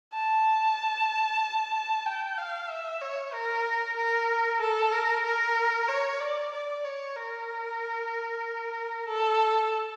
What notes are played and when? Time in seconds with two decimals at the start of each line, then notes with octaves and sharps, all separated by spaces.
0.14 A5
2.06 G5
2.38 F5
2.70 E5
3.01 C#5
3.33 A#4
3.96 A#4
4.60 A4
4.93 A#4
5.25 A#4
5.88 C#5
6.20 D5
6.52 D5
6.84 C#5
7.16 A#4
9.07 A4